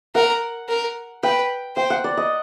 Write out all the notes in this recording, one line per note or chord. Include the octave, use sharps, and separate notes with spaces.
A#4 F#5
A#4
B4 G5
C5 G5
F#5
D5
D#5